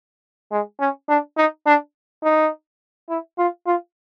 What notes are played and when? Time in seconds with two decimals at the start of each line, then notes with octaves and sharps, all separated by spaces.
0.52 G#3
0.80 C#4
1.09 D4
1.37 D#4
1.66 D4
2.23 D#4
3.09 E4
3.38 F4
3.67 F4